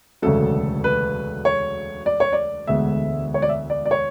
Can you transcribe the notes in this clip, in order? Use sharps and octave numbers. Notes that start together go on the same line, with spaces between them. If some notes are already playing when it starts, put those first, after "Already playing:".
E1 D2 C#3 F#3 A3 A4
B4
C#5
D5
C#5
D5
E1 D2 D3 G#3 B3 E5
C#5
D5
E5
D5
D5
C#5